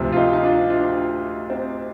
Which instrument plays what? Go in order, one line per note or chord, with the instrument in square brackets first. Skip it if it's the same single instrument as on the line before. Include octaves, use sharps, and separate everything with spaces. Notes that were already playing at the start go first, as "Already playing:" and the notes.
Already playing: [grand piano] D2 C3 F3
F4
D#4 G4
D#4
D4 F4
D4 F4
C4 D#4